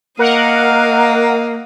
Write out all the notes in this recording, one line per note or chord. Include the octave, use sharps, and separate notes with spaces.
A#3 A#4 D#5 F5 F#5